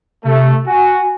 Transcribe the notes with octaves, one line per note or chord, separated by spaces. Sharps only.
C3 A3
F#4 G#5